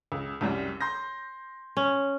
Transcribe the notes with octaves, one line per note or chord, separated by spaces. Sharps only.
C#2
C2 F#2 G3
C6 G6 A#6
C#4